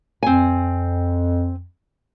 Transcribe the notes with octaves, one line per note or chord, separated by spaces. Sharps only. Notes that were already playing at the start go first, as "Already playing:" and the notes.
F2 C4 G#5